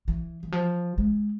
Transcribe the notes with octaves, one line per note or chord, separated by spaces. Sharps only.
E3
E3
F3
G#3